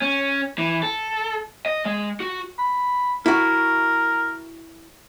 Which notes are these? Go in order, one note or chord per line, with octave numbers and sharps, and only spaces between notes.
C#4
E3
A4
D#5
G#3
F#4
B5
E4 F#4 A#4